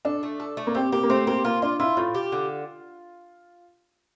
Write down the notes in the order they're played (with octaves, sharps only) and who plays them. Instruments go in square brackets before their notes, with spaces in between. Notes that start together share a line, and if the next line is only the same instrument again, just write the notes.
[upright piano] D4 [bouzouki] A4
[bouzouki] A3
A4
A3
[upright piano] A#3
[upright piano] C4 [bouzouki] G4
[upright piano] A#3 [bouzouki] G4
[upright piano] A#3
[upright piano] A3 [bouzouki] C4
[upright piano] A#3 [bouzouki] G4
[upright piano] A#3 [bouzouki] F4
[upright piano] D4 [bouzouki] F4
[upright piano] E4 [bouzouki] F4
[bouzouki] A2 [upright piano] F4
[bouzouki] G4
D3